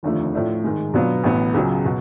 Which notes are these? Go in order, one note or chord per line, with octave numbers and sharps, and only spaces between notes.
F1 D#2 D3 F3 A3
A2 F3 A3 D4
G#2 D#3 G#3
B2 F#3 B3 D4 F4
A1 A2 F#3 B3
C#2 C#3 F#3
B2